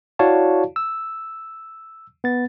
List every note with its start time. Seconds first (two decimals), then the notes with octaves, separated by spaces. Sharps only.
0.19 E4 F#4 C#5 D5 F5 A5
0.76 E6
2.24 B3 A6